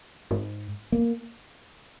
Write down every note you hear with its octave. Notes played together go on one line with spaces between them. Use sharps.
G#2
A#3